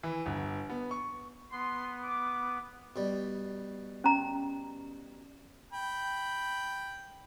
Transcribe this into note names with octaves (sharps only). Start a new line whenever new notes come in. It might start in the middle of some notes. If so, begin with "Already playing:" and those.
E3
G1
B3
C#6
B3 C6
D6
B2 G3
C#4 A#5
G5 B5